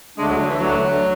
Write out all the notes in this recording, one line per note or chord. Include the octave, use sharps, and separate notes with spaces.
D2 D3 G#3 A3 D4
F#3
D3
E3
D2 D3 F#3 A3 D4